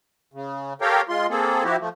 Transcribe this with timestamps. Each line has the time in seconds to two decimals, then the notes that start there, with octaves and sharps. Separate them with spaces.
0.34 C#3
0.81 G4 A4 A#4 C#5 F5 G5
1.09 G#3 F4 C6
1.30 A#3 C4 G#4 A4
1.64 F3 E4 F#4 G4
1.80 F3 A3